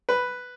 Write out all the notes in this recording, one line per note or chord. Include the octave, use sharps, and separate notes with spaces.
B4